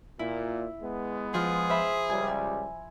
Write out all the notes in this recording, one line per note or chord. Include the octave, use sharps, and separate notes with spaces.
A#2 E4
G#3 B3
F3 F4 G#4
C5 E5 B5
C#2 G3 G#5